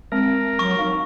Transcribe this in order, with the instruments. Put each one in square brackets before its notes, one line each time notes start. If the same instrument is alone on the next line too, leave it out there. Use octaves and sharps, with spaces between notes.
[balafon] G#3 C4 [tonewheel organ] A#4
[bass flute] F#3 [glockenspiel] C#6
[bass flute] D#4 [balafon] F5